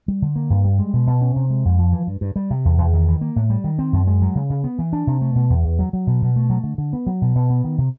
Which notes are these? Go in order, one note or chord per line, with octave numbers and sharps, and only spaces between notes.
G3
D3
A#3
G2
G3
G#3
B2
B2
C#4
C3
G#3
F2
F3
E3
G2
G2
G3
C3
E2
E2
D#3
E3
A#3
A2
G3
D#3
C4
F#2
G#3
F#3
C#3
C#3
B3
E3
D4
C3
A3
B2
E2
E2
F#3
F#3
B2
B2
A3
F#3
D3
D3
B3
F#3
B2
B2
B3
D#3
C3